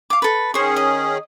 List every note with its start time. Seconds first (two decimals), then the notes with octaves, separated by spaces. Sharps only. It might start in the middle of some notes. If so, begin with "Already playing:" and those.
0.10 F5 D6
0.22 A4 B4
0.54 D#3 C#4 G#4 C5 C#6
0.76 D#5